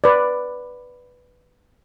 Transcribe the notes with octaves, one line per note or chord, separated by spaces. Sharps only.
B4 D5